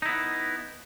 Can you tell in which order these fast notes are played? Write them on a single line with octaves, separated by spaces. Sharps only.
D#4 E4 B3